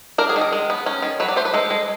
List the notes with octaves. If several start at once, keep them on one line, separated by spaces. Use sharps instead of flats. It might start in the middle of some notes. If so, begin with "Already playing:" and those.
D4 A#4
G#4
D#3
A#4
G#3
B3
C#4
D#3
F#3 B4
D5
A3 C5
B4
G#3 A4
G#3